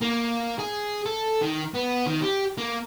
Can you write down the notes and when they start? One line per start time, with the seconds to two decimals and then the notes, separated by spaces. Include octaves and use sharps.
0.02 A#3
0.58 G#4
1.05 A4
1.41 D#3
1.74 B3
2.06 D#3
2.22 G4
2.58 A#3